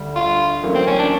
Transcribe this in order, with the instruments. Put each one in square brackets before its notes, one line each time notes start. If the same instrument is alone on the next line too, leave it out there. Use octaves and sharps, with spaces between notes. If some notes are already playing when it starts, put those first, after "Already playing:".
Already playing: [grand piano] D2 D3 G3
[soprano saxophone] F4
[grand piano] A1 A2 F#3 A#3
[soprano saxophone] C4
C#4
D4